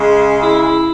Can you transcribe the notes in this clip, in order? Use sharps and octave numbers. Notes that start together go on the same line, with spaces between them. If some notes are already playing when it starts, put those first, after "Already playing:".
Already playing: C#3 G#3
E4